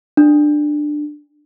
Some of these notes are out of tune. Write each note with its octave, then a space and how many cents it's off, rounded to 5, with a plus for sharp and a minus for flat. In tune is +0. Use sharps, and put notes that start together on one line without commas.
D4 +15